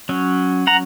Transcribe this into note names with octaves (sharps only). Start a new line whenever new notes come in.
F#3 C#4
F#5 A#5